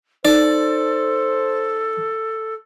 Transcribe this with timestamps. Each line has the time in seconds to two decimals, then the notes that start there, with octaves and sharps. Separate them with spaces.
0.25 D#4 A4 C5 D5